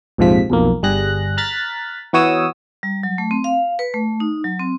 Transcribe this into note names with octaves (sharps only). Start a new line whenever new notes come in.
A#1 F2 G#2 C3 F3 B6
B1 F2 A#3
G1 G3 G#4 F#6 A#6
A#5 F6 F#6 A6 B6
E3 B3 F#4 C#5 D#6 E6
G3
F#3
A3
C4
F5
B4
A3
D#4
F#3
C4